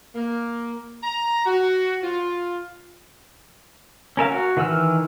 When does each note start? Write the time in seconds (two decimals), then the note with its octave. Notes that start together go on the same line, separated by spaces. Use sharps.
0.15 A#3
1.03 A#5
1.46 F#4
2.03 F4
4.17 C#4 A#4 E5 F5
4.31 F#4
4.57 D#3 E3 B4 E6 F6